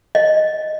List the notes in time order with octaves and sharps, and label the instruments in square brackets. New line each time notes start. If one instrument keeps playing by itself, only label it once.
[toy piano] D#5